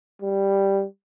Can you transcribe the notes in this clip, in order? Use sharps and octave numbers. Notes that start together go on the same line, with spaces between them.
G3